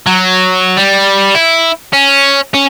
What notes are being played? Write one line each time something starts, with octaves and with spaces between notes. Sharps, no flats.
F#3
G3
E4
C#4
C#4